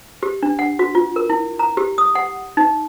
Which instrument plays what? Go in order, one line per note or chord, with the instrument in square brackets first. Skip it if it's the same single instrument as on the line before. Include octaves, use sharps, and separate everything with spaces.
[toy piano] G4
D4
F#5
F#4
F4
A#4
E4
A#5
G4
D#6
F#5
D#4